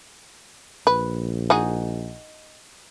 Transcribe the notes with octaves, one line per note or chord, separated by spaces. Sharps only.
A#1 B4
D#4 F#4 G#4